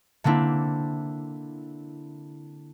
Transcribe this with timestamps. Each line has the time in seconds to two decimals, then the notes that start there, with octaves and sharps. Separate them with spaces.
0.24 D3 A#3 C4 D4 E4